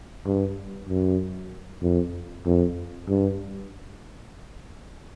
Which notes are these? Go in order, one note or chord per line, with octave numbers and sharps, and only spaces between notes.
G2
F#2
F2
F2
G2